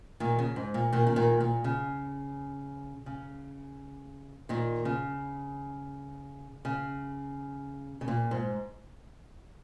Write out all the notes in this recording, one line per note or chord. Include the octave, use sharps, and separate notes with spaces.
A#2 D#3
C#3
G#2
A#2
A#2 D#3
C#3
A#2 D#3
A#2
C#3
C#3
A#2 D#3
C#3
C#3
C#3
A#2
G#2